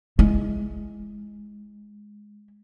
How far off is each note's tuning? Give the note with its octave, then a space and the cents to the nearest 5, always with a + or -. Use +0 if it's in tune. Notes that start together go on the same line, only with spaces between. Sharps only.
G#3 +0 E4 +0